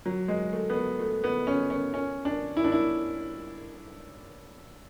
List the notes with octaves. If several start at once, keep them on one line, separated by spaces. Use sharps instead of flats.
F#3
G#3
A3
B3
A3
A3
B3
C#4
C#4
C#4
D4
E4
D4
E4